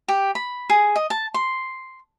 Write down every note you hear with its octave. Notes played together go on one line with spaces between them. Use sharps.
G4
B5
G#4
D#5
A5
C6